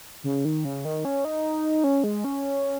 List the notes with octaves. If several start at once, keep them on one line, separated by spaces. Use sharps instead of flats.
C#3
D#3
C#3
D#3
C#4
D#4
C#4
G#3
C#4